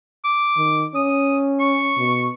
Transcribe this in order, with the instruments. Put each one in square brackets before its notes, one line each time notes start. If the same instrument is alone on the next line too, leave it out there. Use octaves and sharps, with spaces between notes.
[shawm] D6
[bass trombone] D#3
[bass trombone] C#4 [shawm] D#6
[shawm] C#6
[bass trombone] B2